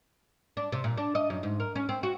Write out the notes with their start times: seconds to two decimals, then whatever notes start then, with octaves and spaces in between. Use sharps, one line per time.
0.57 D4
0.72 C3
0.84 A#2
0.97 D4
1.15 D#5
1.30 F#2
1.43 G#2
1.60 A#4
1.75 C#4
1.89 C4
2.03 F#4